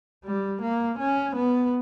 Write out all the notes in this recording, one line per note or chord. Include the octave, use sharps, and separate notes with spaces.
G3
A#3
C#4
B3